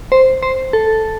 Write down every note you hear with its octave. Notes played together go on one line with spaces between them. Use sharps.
C5
C5
A4